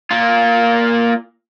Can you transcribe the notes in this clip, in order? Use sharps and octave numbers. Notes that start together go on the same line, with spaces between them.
A#3 F4